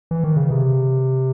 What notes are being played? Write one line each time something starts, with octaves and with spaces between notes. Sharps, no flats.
E3
D#3
C#3
C3